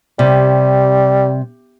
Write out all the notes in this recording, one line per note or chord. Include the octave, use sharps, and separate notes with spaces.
C3 G3